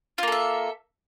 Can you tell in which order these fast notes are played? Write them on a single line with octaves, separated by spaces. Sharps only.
F4 A#3 A4 E5